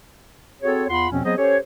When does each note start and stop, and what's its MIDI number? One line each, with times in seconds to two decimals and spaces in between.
0.62 0.85 60
0.62 0.85 66
0.62 0.85 68
0.62 0.85 69
0.62 0.85 73
0.90 1.06 40
0.90 1.06 65
0.90 1.06 78
0.90 1.06 83
0.90 1.06 84
1.10 1.24 40
1.10 1.24 47
1.10 1.24 53
1.10 1.24 60
1.10 1.24 61
1.24 1.33 54
1.24 1.33 59
1.24 1.33 60
1.24 1.33 68
1.24 1.33 72
1.24 1.33 75
1.38 1.57 61
1.38 1.57 67
1.38 1.57 69
1.38 1.57 72
1.38 1.57 73